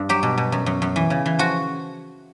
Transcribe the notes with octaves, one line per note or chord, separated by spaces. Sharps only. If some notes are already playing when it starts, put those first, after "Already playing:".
Already playing: G2
F#3 G4
B2
B2
F#2
F#2
F#2
E3
C#3
E3
F3 F#4